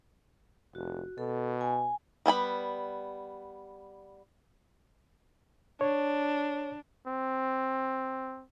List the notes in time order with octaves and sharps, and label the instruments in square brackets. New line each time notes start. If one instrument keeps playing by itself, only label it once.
[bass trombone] F1 [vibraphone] F#4
[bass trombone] B2 [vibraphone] A4
[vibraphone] G#5
[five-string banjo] G3 B3 G#5 B5
[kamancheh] D4 [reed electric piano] C#5
[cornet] C4